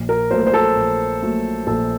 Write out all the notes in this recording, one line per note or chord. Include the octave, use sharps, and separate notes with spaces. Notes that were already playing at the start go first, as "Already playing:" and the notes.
Already playing: A#1
A#4
A#2 F#3 A3 C5
A#4
C5
A4
A#1
A#2 F#3 A3
A#1 A4